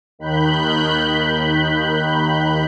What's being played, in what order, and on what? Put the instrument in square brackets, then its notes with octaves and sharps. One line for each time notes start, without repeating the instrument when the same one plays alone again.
[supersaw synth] D#2 D#3 B5 F#6 G6